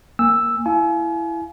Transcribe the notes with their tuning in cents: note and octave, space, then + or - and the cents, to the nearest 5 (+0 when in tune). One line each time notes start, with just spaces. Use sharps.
A#3 +0 G#5 -30 E6 +0
E4 +15 F5 +0 G#5 +40